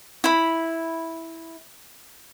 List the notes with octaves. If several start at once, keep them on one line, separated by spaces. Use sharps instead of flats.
E4 B5